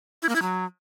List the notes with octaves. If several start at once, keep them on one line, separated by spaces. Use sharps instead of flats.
E4
A#3
E4
F#3